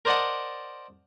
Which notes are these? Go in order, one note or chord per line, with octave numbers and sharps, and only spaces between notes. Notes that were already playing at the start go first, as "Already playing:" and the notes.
A#4 C5 D5 D#5 F#5 A5